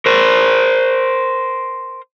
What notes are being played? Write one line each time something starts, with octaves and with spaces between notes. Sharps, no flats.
A#4 C5